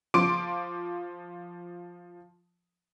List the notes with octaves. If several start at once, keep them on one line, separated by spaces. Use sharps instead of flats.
F3 C6 D6 D7